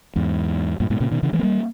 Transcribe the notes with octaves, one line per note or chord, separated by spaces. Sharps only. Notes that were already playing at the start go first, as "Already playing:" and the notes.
E2 G#2
G2 A#2
G#2 B2
A#2 C#3
B2 D#3
C#3 E3
E3 G#3
B3
G3 A#3